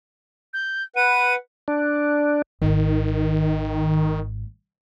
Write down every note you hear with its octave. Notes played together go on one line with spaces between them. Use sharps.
G6
B4 F#5 D#7
D4
G#1 G#2 D#3